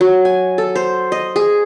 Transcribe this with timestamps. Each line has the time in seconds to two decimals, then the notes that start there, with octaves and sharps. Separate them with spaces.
0.01 F#3
0.25 G#5
0.58 A4
0.75 C5
1.12 D#5
1.36 G#4